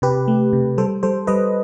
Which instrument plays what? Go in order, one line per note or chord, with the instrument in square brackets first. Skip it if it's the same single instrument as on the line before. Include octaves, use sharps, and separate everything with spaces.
[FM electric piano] C3 G4 B4
A3
C3
G3 A4 C5
G3 A4 C5
G3 B4 D#5